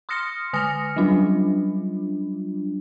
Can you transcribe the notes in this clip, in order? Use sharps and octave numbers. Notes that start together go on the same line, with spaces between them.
C6 D#6 F6 A#6 C#7
D3 G#5 D#6 F6 A#6 C#7
F#3 G3 D4 F4